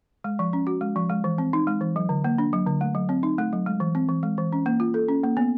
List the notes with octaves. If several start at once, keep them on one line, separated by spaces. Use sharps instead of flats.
G#3
F3
C#4
F#4
G#3
F3
G#3
E3
C4
D#4
G#3
E3
F#3
D3
A#3
D4
F#3
D3
A3
F#3
C4
D#4
A3
F#3
G#3
E3
C4
E3
G#3
E3
C#4
A#3
F4
A4
C#4
A#3
B3